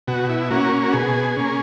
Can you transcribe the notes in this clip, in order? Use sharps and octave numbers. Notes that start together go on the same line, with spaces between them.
B2 F#4
E4
A#3 C#4 F#4
F#4
B2 G#4
A#3 C#4